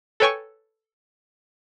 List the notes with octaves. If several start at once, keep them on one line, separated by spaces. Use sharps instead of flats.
A4 B4 C#5 G5 G#5 C#6